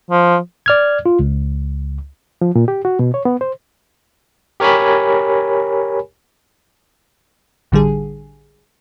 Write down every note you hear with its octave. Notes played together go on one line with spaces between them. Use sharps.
F3
D5 F6 G#6
F4
C#2
F3
A#2
G4
F#4
B2
C#5
B3
C5
G4 A#4 C#5 G#5 B5
A1 D3 G3 G#4